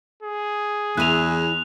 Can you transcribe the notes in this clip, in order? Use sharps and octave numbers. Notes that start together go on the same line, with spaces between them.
G#4
E2 E4 G#5 F#6 F7